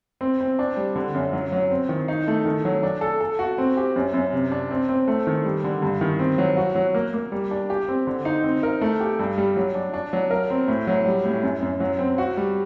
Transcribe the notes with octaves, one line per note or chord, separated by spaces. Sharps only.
C4
C4
D4
G3
D3
F#2
F#3
F#3
C4
D#3
D#4
A3
D#3
F#3
D4
A4
A4
F#4
C4
G4
F#2
F#2
C3
D4
C4
C4
A3
D#3
G3
D3
G2
D#3
C4
F#3
F#4
F#3
A#3
A#3
G3
D4
G4
C4
D3
D#4
C4
A#4
A3
G4
G2
G3
F#3
D4
D4
F#3
A#4
C4
A2
F#3
G3
A2
F#2
F#2
F#3
C4
F#4
G3